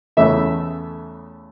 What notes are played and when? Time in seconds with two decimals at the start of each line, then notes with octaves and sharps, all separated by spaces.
0.17 E2 C#3 E3 A3 E5